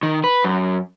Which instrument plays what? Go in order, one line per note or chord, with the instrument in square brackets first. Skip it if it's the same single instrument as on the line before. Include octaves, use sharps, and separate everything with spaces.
[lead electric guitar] D#3
B4
F#2